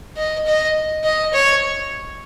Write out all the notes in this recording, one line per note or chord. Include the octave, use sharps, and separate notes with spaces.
D#5
D#5
D#5
C#5